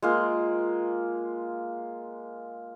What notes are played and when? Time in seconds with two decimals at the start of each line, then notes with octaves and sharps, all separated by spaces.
0.02 G#3 A#3 F4